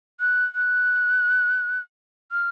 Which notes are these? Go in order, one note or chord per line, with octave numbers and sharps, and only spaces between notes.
F#6
F#6
F6